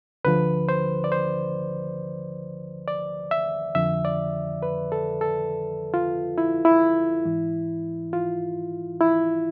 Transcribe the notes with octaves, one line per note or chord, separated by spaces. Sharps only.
D2 D3 F3 B4
C5
D5
C5
D5
E5
F2 D3 F3 E5
D5
B4
A4
A4
F4
E4
E4
G#2 E3
F4
E4